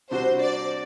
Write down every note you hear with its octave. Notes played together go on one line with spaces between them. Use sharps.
C3 G3 D4 F#4 C5
D5